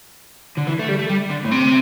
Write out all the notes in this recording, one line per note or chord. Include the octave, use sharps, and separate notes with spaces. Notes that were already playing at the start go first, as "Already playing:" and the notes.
D3
E3
A3
G3
A3
G3
D3
A2
C3